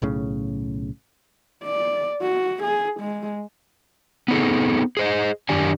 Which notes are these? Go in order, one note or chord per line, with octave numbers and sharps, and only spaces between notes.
B1 A2 C#3
D5
F#4
G#4
G#3
B3 C4 D#4 G#4 A4
G#4 C5 D#5
F#2 D#3 D4 G4 D5 G#5